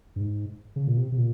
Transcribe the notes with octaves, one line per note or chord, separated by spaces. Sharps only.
G2
G#2
C#3
A#2
C3
C3
A#2